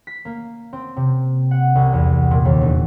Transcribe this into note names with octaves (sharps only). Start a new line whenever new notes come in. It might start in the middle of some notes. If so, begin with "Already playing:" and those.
B6
A#3
C4
C3
F#5
C2
E2
A#2
D#2
E1